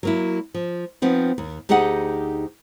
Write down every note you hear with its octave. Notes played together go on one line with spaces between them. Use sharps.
F#3 A#3 E4
F3
F3 B3 C4 D#4
D#2
D2 D#4 G4 G#4 D#5 F#5